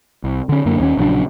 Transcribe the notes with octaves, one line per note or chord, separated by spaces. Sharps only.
C2
D3 C#4
F#2 D3 A#3
D#2 A#3 C#4
A#1 C#3 F#3 D4